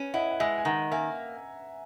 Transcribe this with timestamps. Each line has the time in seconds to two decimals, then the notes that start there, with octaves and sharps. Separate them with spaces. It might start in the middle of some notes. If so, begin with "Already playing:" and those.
Already playing: C#4 B4
0.14 E4 D#5 F#5
0.31 F#5
0.40 G#3 E5 G#5
0.58 G#5
0.65 D#3 F#5 A#5
0.91 A#3 E5 G#5